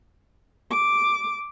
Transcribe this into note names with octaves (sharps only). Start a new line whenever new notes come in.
D6